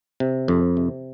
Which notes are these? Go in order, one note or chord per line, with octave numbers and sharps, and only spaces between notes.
C3
F2
C3